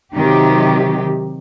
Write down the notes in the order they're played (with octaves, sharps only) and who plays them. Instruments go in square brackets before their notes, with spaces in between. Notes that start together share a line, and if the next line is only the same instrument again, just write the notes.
[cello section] C3 D#3 F#3 G4